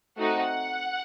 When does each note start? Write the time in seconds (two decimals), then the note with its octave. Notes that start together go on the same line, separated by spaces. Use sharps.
0.18 A3 C4 D#4 F#4 F#5